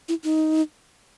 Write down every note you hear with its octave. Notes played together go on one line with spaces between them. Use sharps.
E4
D#4